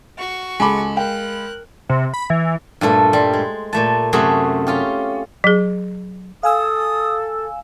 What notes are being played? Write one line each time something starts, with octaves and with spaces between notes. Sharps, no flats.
F#4 C#6
C#2 G#3 A4 G#5 A5 B5 D6
A#4 F5 G5 F#6
C3
B5
E3
G2 A#2 A3 A4
G3 C5
G#3
A#2 A3 A5
F#2 C3 A3 F#4 G#4
C#4 F4 G4
F#3 G#4
A4 F5 G#5 D#6 E6